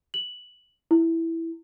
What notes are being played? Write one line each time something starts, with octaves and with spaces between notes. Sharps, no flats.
F#7
E4